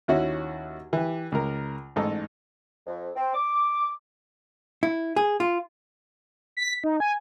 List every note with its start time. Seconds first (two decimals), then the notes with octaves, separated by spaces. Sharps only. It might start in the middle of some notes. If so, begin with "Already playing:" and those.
0.08 D#2 C#4 E4 F#4 F#5
0.93 E3 G4
1.32 C#2 A#4
1.96 A1 G#2 D#4 A4
2.86 F2
3.16 C4
3.34 D6
4.83 E4
5.16 G#4
5.40 F4
6.57 B6
6.84 D#4
7.00 G#5